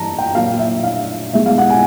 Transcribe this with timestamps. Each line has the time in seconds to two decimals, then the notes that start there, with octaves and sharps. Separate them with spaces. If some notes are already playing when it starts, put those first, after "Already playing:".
Already playing: G2 E3 A5 A#5
0.19 G5
0.35 A#2 F#3 A#3 F5
0.59 E5
0.83 F5
1.33 B2 G#3 E5
1.46 F5
1.58 F#5
1.70 G#5